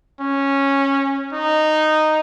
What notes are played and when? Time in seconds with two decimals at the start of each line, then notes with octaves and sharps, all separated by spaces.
0.20 C#4
1.33 D#4